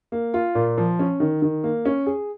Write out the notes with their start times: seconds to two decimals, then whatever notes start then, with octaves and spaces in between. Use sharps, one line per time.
0.12 A#3
0.34 F4
0.55 A#2
0.78 F3
0.99 C#4
1.20 D#3
1.42 D#3
1.64 A#3
1.85 C#4
2.06 G#4